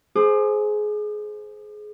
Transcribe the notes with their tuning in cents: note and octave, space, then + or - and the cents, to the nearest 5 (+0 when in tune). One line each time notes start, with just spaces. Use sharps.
G#4 +20 C5 +0 D6 +45